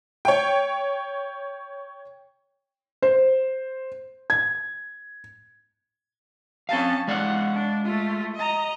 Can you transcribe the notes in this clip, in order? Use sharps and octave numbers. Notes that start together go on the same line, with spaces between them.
C#5 G5
C5
G#6
C4 C#4 F5 A5
G#3 D5 F5 F#5
D4
A3 F4
D#5 A#5